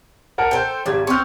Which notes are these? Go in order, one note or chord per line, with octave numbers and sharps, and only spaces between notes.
A#4 F#5 A5
A4 C5 G5
G#1 G3 G#6
C4 C5 C#6 F6